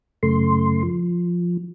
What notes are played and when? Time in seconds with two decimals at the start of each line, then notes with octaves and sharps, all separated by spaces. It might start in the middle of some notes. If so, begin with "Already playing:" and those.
0.23 F#2 C#3 A3 C6
0.83 F3